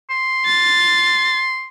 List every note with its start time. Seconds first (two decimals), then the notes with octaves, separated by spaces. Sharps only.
0.10 C6
0.45 A6